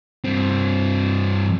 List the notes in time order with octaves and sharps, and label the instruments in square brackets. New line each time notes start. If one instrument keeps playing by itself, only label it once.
[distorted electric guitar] G2 C4